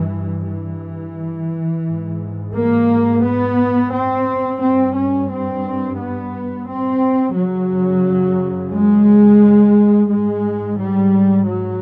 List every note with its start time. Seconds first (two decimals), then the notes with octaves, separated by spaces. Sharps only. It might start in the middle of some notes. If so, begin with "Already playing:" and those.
Already playing: G2 E3
0.49 E3
1.86 G#2
2.55 A#3
3.24 B3
3.93 C4
4.61 G2 C4
4.95 C#4
5.30 C4
5.99 B3
6.68 C4
7.36 F#2 C#3 F#3
8.73 G#3
10.10 G#2 G#3
10.80 G3
11.48 F#3